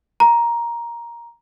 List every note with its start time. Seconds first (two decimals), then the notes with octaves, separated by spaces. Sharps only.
0.20 A#5